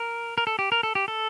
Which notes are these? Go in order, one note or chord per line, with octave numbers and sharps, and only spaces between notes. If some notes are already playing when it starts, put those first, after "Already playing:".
Already playing: A#4
A#4
A4
G4
A#4
A4
G4
A4